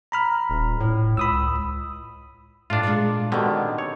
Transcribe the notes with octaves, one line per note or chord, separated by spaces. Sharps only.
A#5 B5 F6
D#1
A2
C#2 B5 D#6 E6
A2 D4 F4
A#2 G#3
B2 D3 D#3 C4 G4
C#5